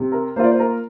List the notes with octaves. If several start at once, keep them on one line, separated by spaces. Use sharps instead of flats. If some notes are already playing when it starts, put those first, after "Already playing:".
Already playing: C3
A#4
A#3 F4 C5 D5
C5
A#4